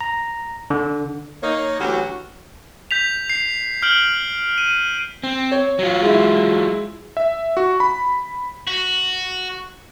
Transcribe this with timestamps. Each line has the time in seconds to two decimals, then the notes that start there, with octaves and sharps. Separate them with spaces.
0.01 A#5
0.70 D3
1.42 A#3 D#4 C#5
1.80 D2 E3 F#3 C#4 F#4 G4
2.91 G6 B6 F7
3.30 C7
3.82 F6 G6 D7 F#7
4.58 D#7
5.23 C4
5.52 C#5
5.79 F#3 F4
6.02 G#3 E4
7.17 E5
7.57 F#4
7.80 B5
8.67 F#4